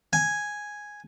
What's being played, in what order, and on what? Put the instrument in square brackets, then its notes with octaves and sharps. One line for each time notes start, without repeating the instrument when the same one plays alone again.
[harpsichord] G#5